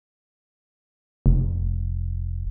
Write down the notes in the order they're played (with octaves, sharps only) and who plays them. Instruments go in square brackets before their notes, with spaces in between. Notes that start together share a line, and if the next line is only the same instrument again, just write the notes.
[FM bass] F1